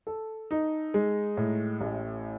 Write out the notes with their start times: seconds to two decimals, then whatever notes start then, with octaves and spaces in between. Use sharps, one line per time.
0.07 A4
0.51 D#4
0.94 G#3
1.37 A2
1.81 A1